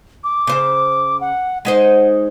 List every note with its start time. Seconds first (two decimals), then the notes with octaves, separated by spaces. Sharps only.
0.24 D6
0.47 C#3 C5
1.21 F#5
1.65 G#3 D#4 C5 F#5